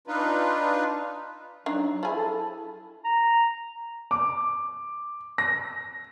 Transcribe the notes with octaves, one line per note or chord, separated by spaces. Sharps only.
D4 D#4 F4 B4
F#3 D4 D#4
F3 E4 G#4
A4
A#5
D6
A#6